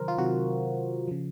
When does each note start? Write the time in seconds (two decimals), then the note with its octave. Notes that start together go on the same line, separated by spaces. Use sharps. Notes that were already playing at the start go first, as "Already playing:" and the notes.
Already playing: C3 D#3 F#3 A#4 C5
0.08 F4
0.18 C3 D#3 F#3 F#4
1.08 C#3 F3